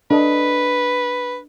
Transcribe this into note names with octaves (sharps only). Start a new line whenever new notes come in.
D4 A4 B4 D#5